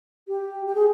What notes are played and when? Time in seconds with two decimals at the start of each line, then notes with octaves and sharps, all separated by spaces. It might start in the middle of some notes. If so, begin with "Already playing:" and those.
0.28 G4
0.66 G4
0.75 G#4